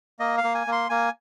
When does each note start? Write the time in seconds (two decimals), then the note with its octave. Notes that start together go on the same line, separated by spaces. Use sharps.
0.20 A#3 D#5
0.38 F5
0.44 A#3
0.55 G#5
0.67 A#3
0.72 C6
0.90 A#3 G#5